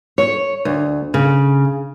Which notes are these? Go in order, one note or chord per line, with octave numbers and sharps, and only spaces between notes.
C#5
D2
C#3